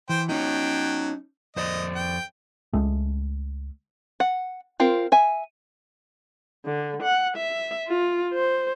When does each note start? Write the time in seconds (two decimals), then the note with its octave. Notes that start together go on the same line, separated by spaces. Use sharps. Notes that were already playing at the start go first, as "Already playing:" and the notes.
0.09 E3 C5 G5
0.29 F#3 C#4 D#4 G5
1.56 F2 C5 D5 D#5
1.95 G5
2.73 C#2 G#3 A3
4.20 F#5
4.80 C4 F4 A#4
5.12 E5 G#5
6.66 D3
7.03 F#5
7.37 E5
7.88 F4
8.34 C5